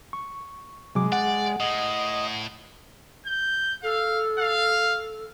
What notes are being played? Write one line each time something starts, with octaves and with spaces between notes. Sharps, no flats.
C#6
C3 F#3 G#3 D6
D5 F#5
A2 D#5
G6
A4 F5
F5